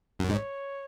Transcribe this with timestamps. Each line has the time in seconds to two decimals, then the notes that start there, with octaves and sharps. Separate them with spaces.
0.19 F#2
0.29 G#2 D#5
0.35 C#5